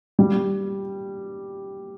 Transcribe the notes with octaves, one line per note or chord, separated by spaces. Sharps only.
G3